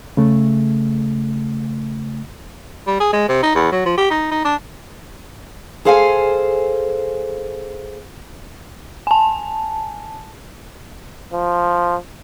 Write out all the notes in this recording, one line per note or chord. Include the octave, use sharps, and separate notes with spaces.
C#3 A3
G3
G#4
G#3
C3
D#4
E2
F#3
F3
G4
D#4
D#4
D4
G#4 A4 C5 F5 G5 G#5
G#5 A5
F3